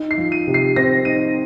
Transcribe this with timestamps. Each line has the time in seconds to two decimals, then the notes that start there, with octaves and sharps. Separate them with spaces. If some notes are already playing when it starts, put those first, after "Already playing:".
Already playing: D#4
0.11 C7
0.17 F3
0.32 D#7
0.47 C3
0.54 C7
0.76 C4 A#6
1.05 D#4 D#7